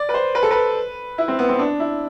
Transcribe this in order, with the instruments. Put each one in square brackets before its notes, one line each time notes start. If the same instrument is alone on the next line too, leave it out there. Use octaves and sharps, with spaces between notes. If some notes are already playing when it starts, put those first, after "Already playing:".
Already playing: [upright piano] D5
B4
C5
B4
A4
B4
E4
C4
B3
C4
D4
E4